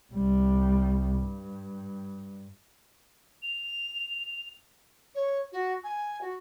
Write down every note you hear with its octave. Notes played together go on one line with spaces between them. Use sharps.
C2 G3
G2
F7
C#5
F#4
G#5
F#4